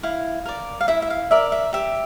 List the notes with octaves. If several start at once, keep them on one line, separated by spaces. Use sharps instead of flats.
E4 F5
A#4 D5
F5
E4 E5
E5
F5
A#4 D5 E5
E5
G4 E5